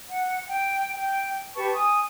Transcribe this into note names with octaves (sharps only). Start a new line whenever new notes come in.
F#5
G5
G5
G4 B4 A5 C#6
G#5 D#6